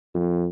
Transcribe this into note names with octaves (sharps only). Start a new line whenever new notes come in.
F2